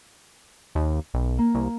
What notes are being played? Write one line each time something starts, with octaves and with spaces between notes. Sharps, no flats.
D#2
B1
A#3
C2